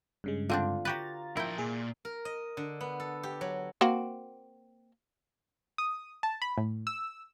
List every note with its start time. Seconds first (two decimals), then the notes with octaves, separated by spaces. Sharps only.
0.24 G2 C#3 G#3
0.49 D3 C4 D4 F4
0.85 F#4 G4 B4 A#5 A6
1.37 F3 E4 A#4 G5
1.58 A#2 G#4
2.05 A#4
2.25 D#5
2.57 D3
2.81 B3
3.00 A4
3.23 G4
3.41 F#3
3.81 A#3 C4 F#4
5.78 D#6
6.23 A5
6.42 B5
6.58 A2
6.87 E6